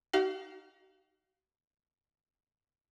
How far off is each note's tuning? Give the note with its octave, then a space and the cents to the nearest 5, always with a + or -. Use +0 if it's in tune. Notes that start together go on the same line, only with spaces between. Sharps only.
D#4 +0 F#4 +45 F5 +0